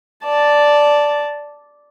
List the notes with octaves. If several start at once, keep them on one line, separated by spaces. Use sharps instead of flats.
D5 A5